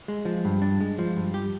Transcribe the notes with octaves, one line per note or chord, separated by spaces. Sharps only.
G#3
F3
G2
D4
G#3
F3
G2
G4